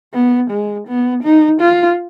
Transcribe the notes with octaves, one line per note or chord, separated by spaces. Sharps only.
B3
G#3
B3
D#4
F4